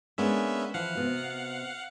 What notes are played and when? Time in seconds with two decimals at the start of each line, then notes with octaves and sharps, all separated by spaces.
0.18 G#3 A#3 B3 C#4 D4 E5
0.74 E3 F3 F5 F#5
0.95 C3 B3 F#4